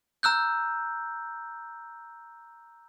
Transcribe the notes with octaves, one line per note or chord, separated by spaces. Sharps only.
A#5 E6 F#6 G6